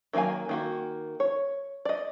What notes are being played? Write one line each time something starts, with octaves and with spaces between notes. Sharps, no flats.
D#3 F#3 A#3 F5 G#5
D#3 A#3 F#4
C#5
D5 D#5